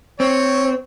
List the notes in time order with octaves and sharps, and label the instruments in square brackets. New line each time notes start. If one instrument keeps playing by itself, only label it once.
[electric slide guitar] C4 [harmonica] C#5